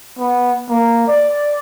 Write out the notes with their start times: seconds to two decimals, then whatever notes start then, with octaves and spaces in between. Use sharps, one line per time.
0.19 B3
0.69 A#3
1.08 D5